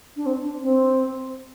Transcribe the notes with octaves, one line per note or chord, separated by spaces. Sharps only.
D4
C4
D4
C4